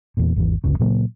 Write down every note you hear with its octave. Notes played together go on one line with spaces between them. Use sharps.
E2 A#2
G#1 E2 E3
G1 D2 C#3
A#2 C#3 F#3 A#3